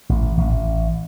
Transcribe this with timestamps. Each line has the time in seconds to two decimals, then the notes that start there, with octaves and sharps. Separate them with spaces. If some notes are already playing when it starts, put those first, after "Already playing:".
0.09 A1
0.38 A1